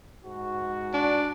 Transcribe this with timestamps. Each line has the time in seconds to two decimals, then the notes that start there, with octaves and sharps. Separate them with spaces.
0.24 G#2 F#4
0.94 D4